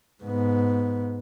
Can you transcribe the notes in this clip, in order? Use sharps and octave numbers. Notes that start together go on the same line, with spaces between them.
G#2 B3